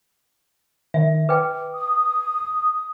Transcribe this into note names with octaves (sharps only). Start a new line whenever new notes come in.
D#3 E5
B4 G5 D6
D#6